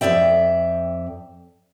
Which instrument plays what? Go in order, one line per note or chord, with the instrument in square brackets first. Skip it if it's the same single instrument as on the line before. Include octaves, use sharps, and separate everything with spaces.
[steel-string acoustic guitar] F2 G#2 D5 E5 G5